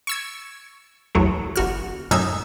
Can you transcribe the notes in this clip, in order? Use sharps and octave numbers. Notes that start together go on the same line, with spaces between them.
C#6 E6 G#6
A1 E2 F#3 A3
G1 F#4 F6
F#2 A2 D#4 E5 G#6